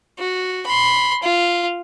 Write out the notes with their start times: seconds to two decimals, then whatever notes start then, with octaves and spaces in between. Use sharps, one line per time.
0.19 F#4
0.66 B5 C6
1.23 F4